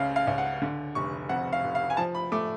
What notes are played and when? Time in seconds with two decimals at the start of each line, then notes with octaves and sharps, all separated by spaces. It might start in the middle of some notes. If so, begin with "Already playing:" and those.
Already playing: C#2 C#3 F5
0.16 F5
0.27 C#2
0.38 F#5
0.62 D3
0.95 F1 C#6
1.29 F2 F#5
1.53 F5
1.64 F1
1.75 F5
1.90 G#5
1.97 F3 A5
2.15 B5
2.32 A3 D6